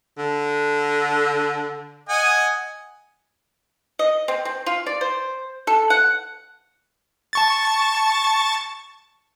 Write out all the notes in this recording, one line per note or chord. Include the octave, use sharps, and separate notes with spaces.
D3
D#5 F#5 G#5
D#5
C4
C4
F4
D5
C5
A4
F#5
A5 C#6 A6